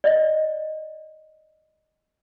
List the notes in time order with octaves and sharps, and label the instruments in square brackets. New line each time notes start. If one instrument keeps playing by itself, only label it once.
[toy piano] D5 D#5